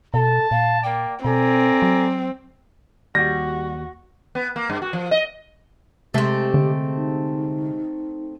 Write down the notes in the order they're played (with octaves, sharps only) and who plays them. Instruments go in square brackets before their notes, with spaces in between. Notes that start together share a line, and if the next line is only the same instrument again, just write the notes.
[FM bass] B2 [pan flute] A4 [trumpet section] A5
[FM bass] A#2 [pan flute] F5
[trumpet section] A#3 D5 [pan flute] G5
[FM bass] B2 [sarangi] C4 [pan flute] A4 [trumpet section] D5 G#5 A#5
[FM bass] F#3
[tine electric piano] D#2 [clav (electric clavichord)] G3 [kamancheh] F#4 [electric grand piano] A#6
[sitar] B3
A#3
G2
F#4
F3
D#5
[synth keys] C3 G#3 [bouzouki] A3 C4 [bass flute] G4
[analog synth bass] D3
[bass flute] D#4